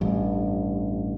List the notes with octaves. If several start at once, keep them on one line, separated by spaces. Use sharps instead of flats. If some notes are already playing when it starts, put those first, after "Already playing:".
A1 G2